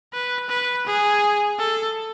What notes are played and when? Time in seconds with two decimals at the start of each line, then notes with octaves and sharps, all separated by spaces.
0.13 B4
0.49 B4
0.86 G#4
1.59 A4